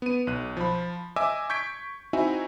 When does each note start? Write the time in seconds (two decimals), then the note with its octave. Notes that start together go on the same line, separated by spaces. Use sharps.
0.02 B3 D#7
0.27 B1 F#6
0.57 F3 B5
1.16 D#5 E5 G#5 D6 E6
1.50 C#6 G6 G#6 B6 D7
2.13 C4 D#4 E4 F#4 E5 G#5